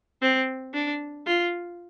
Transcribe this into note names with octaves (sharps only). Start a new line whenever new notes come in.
C4
D4
F4